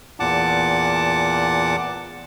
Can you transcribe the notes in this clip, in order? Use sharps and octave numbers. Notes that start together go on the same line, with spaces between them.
E2 A#2 F#5 A5 D6